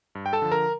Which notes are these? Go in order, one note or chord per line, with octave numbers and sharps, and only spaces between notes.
G2
G5
A4 A5
D3 F3
A#4 A#5